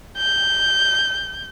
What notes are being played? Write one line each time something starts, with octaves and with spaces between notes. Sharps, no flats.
G6